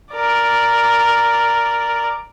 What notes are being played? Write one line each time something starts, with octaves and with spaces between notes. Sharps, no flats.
A#4 D5